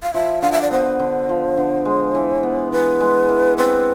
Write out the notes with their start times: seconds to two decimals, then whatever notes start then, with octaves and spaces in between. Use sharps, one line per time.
0.03 F5
0.14 F3 E5
0.42 D3 F5
0.52 E5
0.62 D5
0.71 B3 C5
0.99 D3
1.29 F3
1.57 D3
1.85 G#3
2.15 E3
2.43 B3
2.72 E3 B4
3.01 G#3
3.29 E3
3.58 C4 B4